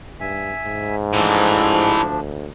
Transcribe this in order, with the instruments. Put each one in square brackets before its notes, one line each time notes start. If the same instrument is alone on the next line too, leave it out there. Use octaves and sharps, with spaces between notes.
[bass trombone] G2 [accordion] E5 G#5
[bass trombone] G#2
[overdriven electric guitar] A2 E3 [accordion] F3 D4
[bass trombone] D2